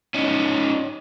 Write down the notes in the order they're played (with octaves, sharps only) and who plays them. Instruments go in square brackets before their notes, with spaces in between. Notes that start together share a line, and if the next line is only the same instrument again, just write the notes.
[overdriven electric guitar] C#4 D#4